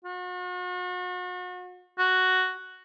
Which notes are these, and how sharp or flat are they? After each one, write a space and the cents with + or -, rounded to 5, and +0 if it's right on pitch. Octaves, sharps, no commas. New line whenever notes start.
F#4 -40
F#4 +5